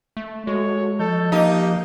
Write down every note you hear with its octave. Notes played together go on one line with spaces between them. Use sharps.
A3
G#3 F#4 A4 C#5
F3 A4 D#5 G6
A#3 D#4 G4